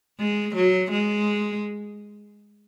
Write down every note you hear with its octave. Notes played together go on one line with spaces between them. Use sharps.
G#3
F#3
G#3